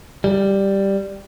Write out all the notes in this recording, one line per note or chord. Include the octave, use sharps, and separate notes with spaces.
G3